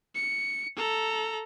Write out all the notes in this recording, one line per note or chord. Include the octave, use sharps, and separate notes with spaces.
C#7
A4 A#5